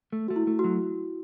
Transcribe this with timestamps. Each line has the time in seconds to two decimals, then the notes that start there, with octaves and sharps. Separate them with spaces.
0.12 A3
0.28 A3 F#4
0.36 E4
0.47 A3
0.59 F#4
0.64 F#3